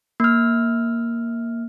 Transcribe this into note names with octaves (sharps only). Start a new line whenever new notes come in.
A#3 F6